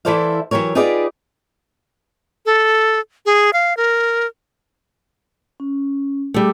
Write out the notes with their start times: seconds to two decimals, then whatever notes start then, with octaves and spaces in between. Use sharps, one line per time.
0.05 E3 E4 A4 C5 D5 F5
0.51 E3 F#3 G4 A#4 C#5
0.75 D#4 F4 G4 G#4 B4 D5
2.46 A4
3.26 G#4
3.53 F5
3.77 A#4
5.60 C#4
6.34 G3 A3 G#4 D6 E6